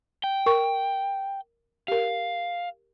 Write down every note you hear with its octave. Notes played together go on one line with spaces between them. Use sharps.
G5
A#4 C#6
G4 A#4 F5